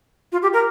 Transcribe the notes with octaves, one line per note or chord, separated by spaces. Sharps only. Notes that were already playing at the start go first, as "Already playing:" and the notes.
F4
G4
A#4